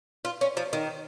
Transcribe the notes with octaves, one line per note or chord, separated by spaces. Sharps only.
F4
C#4
F3
D#3